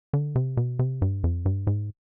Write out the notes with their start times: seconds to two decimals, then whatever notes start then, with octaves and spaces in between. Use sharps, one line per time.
0.13 D3
0.36 C3
0.57 B2
0.79 C3
1.02 G2
1.24 F2
1.46 G2
1.67 G#2